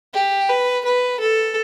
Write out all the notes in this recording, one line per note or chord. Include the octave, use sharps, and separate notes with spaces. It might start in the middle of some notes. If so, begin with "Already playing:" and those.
G4
B4
B4
A4